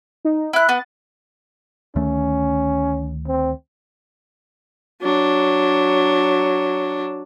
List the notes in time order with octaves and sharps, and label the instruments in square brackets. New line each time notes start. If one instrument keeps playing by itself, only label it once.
[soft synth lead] D#4
[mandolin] E4 F#6 [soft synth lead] E5
[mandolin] B3 [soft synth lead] A6
[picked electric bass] D2 D#3 A3 [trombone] C#4
[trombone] C4
[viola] F#3 D4